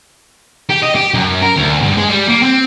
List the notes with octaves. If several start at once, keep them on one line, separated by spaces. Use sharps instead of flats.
G4
D#5
G4
F#2
A#4
D2
G2
G#3
G3
A#3
C4